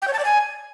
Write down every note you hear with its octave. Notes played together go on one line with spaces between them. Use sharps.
G5
C#5
A5
D5
G#5